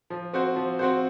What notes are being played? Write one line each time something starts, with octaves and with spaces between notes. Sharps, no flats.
F3
C4 F#4 C5
F3
C4 F#4 C5